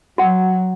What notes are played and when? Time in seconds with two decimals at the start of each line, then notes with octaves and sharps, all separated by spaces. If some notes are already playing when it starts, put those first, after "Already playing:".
0.18 F#3 F#4 F#5